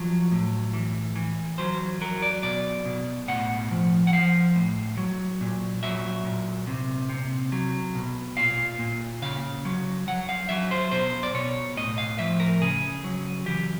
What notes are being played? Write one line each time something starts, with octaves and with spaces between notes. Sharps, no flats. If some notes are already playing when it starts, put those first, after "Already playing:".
Already playing: F3 F#3
A2
E3
E3
F#3 C5
F#3 A#4
D5
B2 D5
B2
A2 F#5
F3
F#5
F3 F5
A2
F#3
A#2
F#3 E5
A#2
C3
C3
F#3
B2
A#2 F5
A#2
C#3 F5
F#3
F#3 F#5
F5
F#3 E5
C5
B2 C5
D5
B2 C#5
A2 D#5
F5
F3 E5
A#4
C#3 G#4
F#3
E3 G4